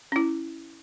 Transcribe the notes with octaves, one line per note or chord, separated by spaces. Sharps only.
C#4 E4